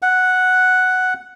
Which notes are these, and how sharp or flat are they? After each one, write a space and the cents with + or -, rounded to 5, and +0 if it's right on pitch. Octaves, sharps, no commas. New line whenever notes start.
F#5 +0